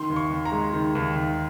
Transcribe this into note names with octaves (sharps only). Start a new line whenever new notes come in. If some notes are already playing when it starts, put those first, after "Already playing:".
Already playing: D#3 C6
D#2
C#6
D#2
A#5
G#3
D#3
D#2
D#2